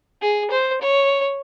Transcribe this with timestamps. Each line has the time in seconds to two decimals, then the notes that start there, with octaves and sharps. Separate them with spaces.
0.22 G#4
0.51 C5
0.81 C#5